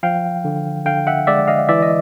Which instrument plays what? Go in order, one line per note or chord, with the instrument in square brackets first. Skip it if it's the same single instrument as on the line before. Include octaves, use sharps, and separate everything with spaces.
[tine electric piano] F3 F5 G5
D3
D3 F5 G5
E5 F#5
G#3 D5 E5
D#5 F5
E3 D5 E5
D#5